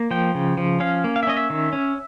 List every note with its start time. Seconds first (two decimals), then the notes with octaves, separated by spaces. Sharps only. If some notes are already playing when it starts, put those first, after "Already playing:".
Already playing: A#3
0.11 F3 G5
0.35 C#3
0.58 F3
0.80 C#4 F5
1.04 A#3
1.16 F5
1.23 E5
1.27 C#4 D#5
1.37 E5
1.50 D#3
1.73 C#4